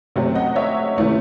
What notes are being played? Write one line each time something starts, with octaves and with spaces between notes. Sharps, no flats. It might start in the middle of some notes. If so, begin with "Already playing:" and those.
C3 F#3 A3 C4
D#5 F#5
C#5 E5
C3 E3 A3 C#4